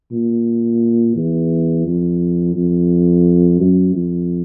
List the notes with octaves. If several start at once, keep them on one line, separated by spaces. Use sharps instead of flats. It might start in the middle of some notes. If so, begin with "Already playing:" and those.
A#2
E2
F2
F2
F#2
F2